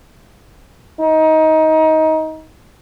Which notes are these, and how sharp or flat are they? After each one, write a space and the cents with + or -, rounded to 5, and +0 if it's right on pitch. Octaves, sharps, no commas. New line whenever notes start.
D#4 +20